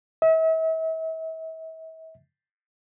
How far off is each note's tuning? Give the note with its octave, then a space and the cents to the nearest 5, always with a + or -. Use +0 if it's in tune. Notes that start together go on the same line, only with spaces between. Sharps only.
E5 -40